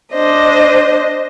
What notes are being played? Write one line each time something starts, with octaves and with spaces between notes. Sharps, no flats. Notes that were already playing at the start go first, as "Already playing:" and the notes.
D4 C5 D#5